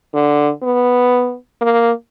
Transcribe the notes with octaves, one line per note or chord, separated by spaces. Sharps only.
D3
B3
A#3